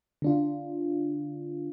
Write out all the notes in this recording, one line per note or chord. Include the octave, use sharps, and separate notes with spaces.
D3 D4 F4